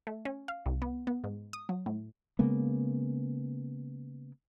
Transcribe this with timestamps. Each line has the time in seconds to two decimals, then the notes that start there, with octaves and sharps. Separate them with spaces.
0.07 A3
0.25 C#4
0.48 F5
0.66 C2
0.82 B3
1.07 B3
1.24 G#2
1.53 D#6
1.69 F#3
1.86 A2
2.39 C#3 G#3 A#3 B3